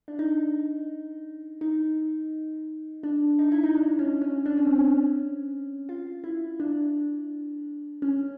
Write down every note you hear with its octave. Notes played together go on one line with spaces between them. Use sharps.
D4
D#4
D#4
D4
D#4
E4
D#4
D4
C#4
C#4
D4
C#4
C4
C#4
F4
E4
D4
C#4